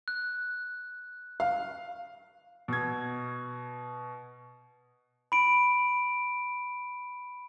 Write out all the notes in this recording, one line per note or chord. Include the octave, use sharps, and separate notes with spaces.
F#6
F5
B2 G#6
B5 D7